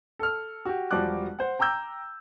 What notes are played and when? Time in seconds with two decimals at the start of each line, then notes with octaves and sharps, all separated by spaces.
0.19 A4 F6
0.65 F#4 G4
0.91 E1 F3 G3 F#4 D6 F#6
1.39 C5 F#5
1.59 G5 A#5 D6 E6 G6